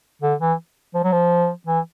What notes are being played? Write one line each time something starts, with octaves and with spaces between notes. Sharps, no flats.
D3
E3
F3
F#3
F3
E3